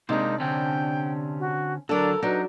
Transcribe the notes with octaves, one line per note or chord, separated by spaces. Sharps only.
C3 G#3 A#3 D4 D#4 C5
D3 C4 C#4 G5
F#4
D3 F#3 D4 A4 A#4
F#3 D4 D#4 B4